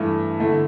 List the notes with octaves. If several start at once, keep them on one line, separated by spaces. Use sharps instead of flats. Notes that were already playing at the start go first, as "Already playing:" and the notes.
Already playing: G2 E3 A3
D3 A3 E4